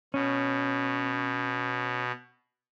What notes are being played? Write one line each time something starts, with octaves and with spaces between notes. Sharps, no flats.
B2 C#4